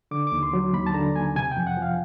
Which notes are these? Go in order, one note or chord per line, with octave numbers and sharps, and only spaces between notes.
D3 D6
D6
D#2
C6
F#3
D#2 B5
A5
D3 A#5
D#2 G#5
C3 G#5
G5
F2
F#5
F3
F5